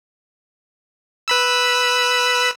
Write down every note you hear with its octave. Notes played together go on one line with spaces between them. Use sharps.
B4 B5 E6